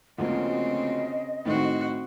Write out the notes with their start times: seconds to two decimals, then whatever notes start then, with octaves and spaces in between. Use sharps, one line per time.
0.18 D2 C#3 F3 A#3 C4 D#5
1.46 A2 D#3 C4 F#4